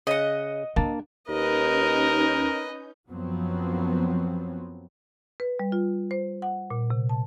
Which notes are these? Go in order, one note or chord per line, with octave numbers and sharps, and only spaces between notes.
C#3 D#5 F#5
A#3 D4 A5
D#2 C#4 D#4 A#4 B4 D#5 G6
F#2 F3 F#3 B3 C4
B4
G3
F4
C5
F#5
A#2
C3
A5